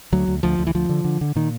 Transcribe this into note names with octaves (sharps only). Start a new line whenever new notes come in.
D2 F#3
D2
D2 F3
D2
E3
D2 F3
D3
D3
D3
A#2 D#3